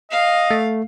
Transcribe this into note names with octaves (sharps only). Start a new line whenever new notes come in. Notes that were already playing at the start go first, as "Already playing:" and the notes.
D#5 F5
A3